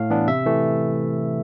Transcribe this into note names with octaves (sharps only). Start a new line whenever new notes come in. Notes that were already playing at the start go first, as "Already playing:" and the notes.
Already playing: A2 F5
E3 B3 D4
C3 E5
E3 A3